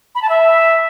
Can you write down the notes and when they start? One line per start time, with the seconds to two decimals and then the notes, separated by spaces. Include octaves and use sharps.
0.15 B5
0.22 A5
0.29 E5